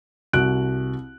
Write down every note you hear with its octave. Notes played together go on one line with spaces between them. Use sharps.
C2 F#4 F#6 D7